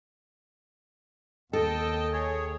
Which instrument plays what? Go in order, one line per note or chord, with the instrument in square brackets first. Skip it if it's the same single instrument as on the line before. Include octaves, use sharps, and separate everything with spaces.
[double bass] D#2 [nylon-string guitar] A4 [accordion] D#5 G5 A5
[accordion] G#4 C#5